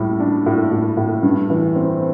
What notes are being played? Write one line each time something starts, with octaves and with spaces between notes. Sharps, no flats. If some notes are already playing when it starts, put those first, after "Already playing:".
Already playing: A2 G3
D4
A2
A2
A2
G2
E3
C4